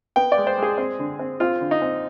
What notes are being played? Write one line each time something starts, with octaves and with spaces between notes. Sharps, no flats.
B3 G5
D5
G#3
C5
G#3 G#4
C4
D3
C4
C4 F4
D3
D#4
C4